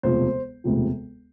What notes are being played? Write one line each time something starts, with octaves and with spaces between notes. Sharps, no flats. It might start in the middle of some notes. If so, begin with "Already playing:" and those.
E1 D2 C3 F3 C5
E1 D2 C3 F3